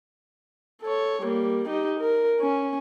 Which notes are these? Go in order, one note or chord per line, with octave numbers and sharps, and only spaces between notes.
A4 C#5
G3 A#3
D#4 G4
A#4
C#4